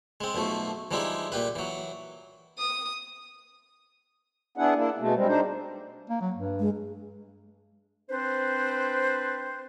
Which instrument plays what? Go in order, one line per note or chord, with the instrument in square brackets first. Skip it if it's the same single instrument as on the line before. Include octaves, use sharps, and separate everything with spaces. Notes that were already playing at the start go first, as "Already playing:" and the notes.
[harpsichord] G#3 C4
B1 B2 F3 A3
E3 F3 G3 G#3 D#4 E4
A#2 G4 B4
E3 F#3
[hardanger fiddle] D#6
[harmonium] B3 D4 E4 G#4 F#5
A#3 D4 E4
B2 G#3 A3
G3 G#3 C4
D4 D#4 C5
[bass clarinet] A#3
F#3
G2
[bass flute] G#3
[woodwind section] C4 D4 B4 C5